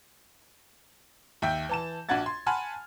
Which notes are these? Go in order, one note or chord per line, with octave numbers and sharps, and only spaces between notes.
D#2 E5 G5 G6
E3 A5 E7
A#1 D4 F#4 F#5 G#6 A6
C6
F#5 G#5 A5 B5 C6 F6